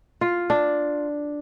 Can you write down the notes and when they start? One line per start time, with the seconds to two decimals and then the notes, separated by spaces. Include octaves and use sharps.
0.21 F4
0.50 D4